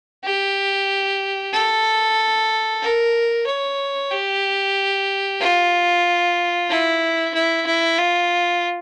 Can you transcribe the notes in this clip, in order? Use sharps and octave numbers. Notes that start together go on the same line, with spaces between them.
G4
A4
A#4
C#5
G4
F4
E4
E4
E4
F4